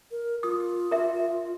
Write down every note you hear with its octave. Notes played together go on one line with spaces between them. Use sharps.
A#4
F4 D#6
A#4 E5